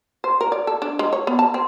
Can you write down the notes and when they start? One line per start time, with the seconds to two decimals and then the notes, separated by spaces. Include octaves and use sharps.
0.24 C5
0.41 A#4
0.52 D5
0.67 A4
0.82 D4
0.99 G#3
1.13 C#5
1.27 B3
1.39 A5
1.54 C4